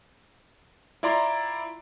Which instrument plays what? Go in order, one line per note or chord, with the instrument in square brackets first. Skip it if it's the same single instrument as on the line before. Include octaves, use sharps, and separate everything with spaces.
[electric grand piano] E4 F4 D5 A#5 C6 D6